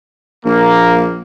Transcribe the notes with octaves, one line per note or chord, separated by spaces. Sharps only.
A#1 A#3